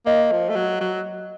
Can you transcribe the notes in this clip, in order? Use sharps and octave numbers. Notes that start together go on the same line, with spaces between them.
A#3 D#5
F3
A3
F#3
F#3